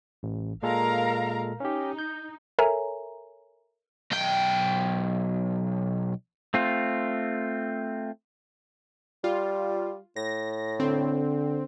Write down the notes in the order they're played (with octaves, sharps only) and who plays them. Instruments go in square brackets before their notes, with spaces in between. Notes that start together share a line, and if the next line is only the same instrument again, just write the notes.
[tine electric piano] A1
[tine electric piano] A#2 G#3 A4 [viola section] A#4 F5 A#5
[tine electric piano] C#4 G4 [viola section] D#4
[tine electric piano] G6
[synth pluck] A4 A#4 C#5 E5 G#5 A#5
[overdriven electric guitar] B1 G5
[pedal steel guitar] A3 C4 F4
[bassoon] G3 [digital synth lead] F4
[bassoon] A2 [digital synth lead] A#6
[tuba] D3 [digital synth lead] C4